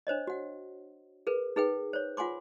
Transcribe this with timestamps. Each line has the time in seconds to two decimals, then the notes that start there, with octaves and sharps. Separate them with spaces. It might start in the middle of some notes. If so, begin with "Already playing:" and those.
0.07 D4 C5 C#5 D#5
0.27 F#4 F#5
1.27 G#4 A#4 B4
1.56 D#4 G#4 B4 G5
1.93 C5 C#5
2.17 F4 F#5 G#5 C6 D6